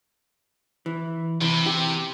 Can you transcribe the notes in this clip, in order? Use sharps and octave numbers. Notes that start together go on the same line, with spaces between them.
E3
C3 E3
G4